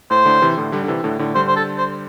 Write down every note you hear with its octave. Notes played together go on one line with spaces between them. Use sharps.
A2 C5
A2 D3
C3 E3
A2 D3
D3 G3
D3
C3 E3
A2 D3
A2 D3
D3 G3 C5
C5
A4
C5